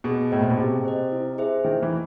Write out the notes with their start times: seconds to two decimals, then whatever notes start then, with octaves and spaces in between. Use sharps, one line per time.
0.04 B2 G#4
0.31 A2 C5 D#5
0.41 A#2
0.50 B2
0.57 C3 G#4
0.85 C5 D#5
1.12 E4
1.38 G#4 C5 E5
1.64 D#3 E4
1.83 E3